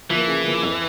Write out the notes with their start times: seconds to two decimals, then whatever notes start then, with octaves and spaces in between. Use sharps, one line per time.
0.10 E3 F3 A#3
0.27 C#3
0.44 F3 A#3
0.63 F2